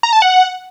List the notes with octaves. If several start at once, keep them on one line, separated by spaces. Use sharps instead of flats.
A#5
A5
F#5